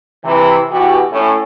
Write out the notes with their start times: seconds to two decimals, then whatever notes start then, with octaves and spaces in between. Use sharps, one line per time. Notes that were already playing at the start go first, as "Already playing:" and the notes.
0.24 C3 E3
0.71 B2 E3 F#4 G4
1.12 A2 A3 C#4